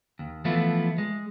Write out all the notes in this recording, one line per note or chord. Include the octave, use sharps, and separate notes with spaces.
D#2
E3 F3 A3 B3 E4 F4
G#3